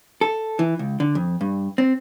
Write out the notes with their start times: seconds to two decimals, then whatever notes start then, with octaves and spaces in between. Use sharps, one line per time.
0.21 A4
0.59 E3
0.79 C#2
1.00 D3
1.15 F2
1.41 G2
1.78 C4